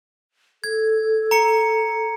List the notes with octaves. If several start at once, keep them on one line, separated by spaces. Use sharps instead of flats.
A4 G#6
A#5 C#7